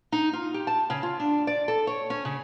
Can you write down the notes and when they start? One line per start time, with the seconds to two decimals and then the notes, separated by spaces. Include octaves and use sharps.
0.12 D#4
0.33 F4
0.54 G4
0.67 A5
0.90 C#3
1.03 F4
1.20 D4
1.47 D5
1.68 A4
1.87 C#5
2.10 C#4
2.25 C#3